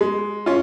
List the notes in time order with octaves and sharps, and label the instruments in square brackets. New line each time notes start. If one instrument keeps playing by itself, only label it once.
[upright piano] G#3
C#4 F4